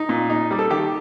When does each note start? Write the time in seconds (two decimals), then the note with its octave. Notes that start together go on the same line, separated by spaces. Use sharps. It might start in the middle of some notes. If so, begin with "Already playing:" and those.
Already playing: D#4
0.09 A#2
0.30 D#4
0.51 G3
0.59 A4
0.71 D#3 G4